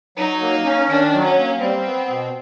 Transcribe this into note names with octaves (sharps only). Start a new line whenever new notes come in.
F#3 D#4
A#3
C#4
D#3 D4
F#3
C#4
A#3
G3 C4
B3
B2